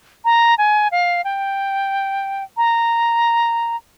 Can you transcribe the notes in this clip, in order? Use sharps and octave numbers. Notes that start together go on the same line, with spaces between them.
A#5
G#5
F5
G5
A#5